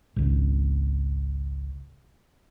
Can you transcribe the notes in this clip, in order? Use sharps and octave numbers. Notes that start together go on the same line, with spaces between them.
G#1 C#2